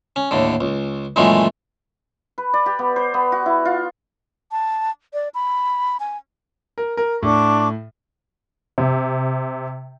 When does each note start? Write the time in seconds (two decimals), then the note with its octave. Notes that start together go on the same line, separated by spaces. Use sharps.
0.16 C#4
0.31 D#2 A2 D3
0.61 C#2
1.16 F#2 A#2 D#3 E3 G#3 A3
2.38 B4
2.54 D5
2.66 G4
2.79 B3
2.96 C5
3.14 B3
3.32 F#4
3.46 E4
3.65 F4
4.52 A5
5.13 D5
5.34 B5
6.00 G#5
6.78 A#4
6.97 A#4
7.23 A2 D4 C#6 D6
8.78 C3